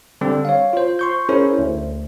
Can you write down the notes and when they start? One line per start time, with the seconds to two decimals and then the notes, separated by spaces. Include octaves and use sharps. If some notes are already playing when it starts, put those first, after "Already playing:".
0.21 D3 G3 C4
0.45 C#5 F5
0.73 F4 C5
0.99 C6 C#6 G6
1.29 C#4 E4 G#4 A#4 C5 C#5
1.58 D2